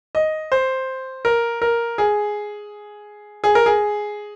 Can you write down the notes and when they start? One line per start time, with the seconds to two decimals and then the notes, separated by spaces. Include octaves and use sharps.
0.15 D#5
0.52 C5
1.25 A#4
1.62 A#4
1.98 G#4
3.44 G#4
3.55 A#4
3.66 G#4